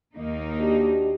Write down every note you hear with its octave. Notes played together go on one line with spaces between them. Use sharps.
D#2 A#3 D#4
D4 F#4 G4